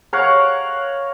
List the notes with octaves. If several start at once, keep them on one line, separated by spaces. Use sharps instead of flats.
A#4 C#5 F5 F#5